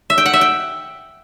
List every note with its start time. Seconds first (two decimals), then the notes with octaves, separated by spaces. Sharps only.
0.10 E5
0.18 G5
0.26 F#5
0.33 E5
0.41 G5